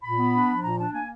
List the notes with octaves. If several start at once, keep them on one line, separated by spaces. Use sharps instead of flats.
A#2 B5
B3
D4
F3
A#2 A#5
D4 A5
A#3 G#5